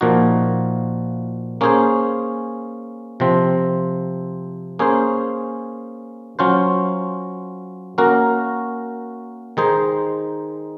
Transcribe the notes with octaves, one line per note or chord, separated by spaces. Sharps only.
A#2 F3 A#3 D#4 F#4
A#3 C#4 G#4 C5
C3 F3 C4
A#3 C#4 G#4 C5
F#3 C#4 F4 C5
A#3 C#4 F#4 A#4
D#3 G#3 D#4 G#4 C5